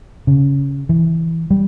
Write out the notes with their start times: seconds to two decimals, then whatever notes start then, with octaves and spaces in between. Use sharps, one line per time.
0.27 C#3
0.89 E3
1.51 G3